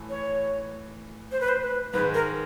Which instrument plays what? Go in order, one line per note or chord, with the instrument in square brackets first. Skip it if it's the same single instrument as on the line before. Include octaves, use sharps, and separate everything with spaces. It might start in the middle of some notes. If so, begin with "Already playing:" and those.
Already playing: [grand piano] A2 E3 A3
[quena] C#5
C5
B4
C5
B4
[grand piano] G#2 D#3 G#3 [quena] B4
[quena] A#4